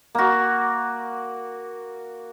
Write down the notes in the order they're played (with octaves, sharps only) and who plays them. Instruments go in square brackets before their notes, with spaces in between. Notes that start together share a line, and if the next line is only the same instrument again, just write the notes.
[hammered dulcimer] A#3 F#4